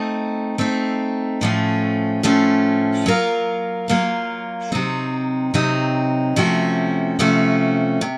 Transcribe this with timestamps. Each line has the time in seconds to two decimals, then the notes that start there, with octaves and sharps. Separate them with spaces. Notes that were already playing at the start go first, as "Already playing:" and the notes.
Already playing: A3 C4 D#4
0.58 A3 C4 D#4
1.41 A2 F3 A3 C#4
2.23 A2 F3 A3 C#4
3.06 F#3 A#3 F4 A#4 F5
3.88 F#3 A#3 F4 A#4 F5
4.72 C3 F#3 C4 D#4
5.54 C3 F#3 C4 D#4
6.36 C3 F3 A3 C#4 F#4
7.19 C3 F3 A3 C#4 F#4
8.01 C3